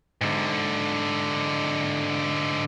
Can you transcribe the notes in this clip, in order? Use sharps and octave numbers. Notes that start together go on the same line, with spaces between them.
G#2 D3